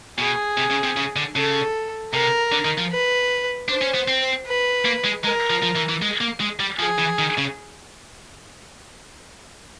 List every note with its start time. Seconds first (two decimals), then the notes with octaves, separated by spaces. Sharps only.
0.19 B2 G#4
0.58 C3
0.71 C#3
0.84 C3
0.97 C#3
1.16 D3
1.35 C#3 A4
2.13 C3 A#4
2.52 D3
2.65 D#3
2.78 F3
2.91 B4
3.69 D4 C5
3.82 C#4
3.95 B3
4.08 C4
4.46 B4
4.85 A#3
5.05 G#3
5.24 G#3 A#4
5.50 F3
5.63 F3
5.76 E3
5.89 E3
6.02 G#3
6.21 A#3
6.40 G#3
6.60 G3
6.79 F3 G#4
6.99 E3
7.19 D#3
7.38 C#3